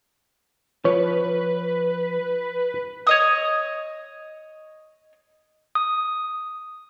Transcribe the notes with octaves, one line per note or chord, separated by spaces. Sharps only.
F3 B4 C#5
C#5 D#5 D#6
D#6